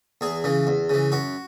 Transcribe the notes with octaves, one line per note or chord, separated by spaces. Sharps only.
E2 G#4
C#3 E3
E2
C#3 E3
F#2 F#4